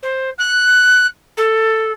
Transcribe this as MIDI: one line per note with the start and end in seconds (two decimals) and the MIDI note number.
0.02 0.30 72
0.38 1.06 90
1.37 1.92 69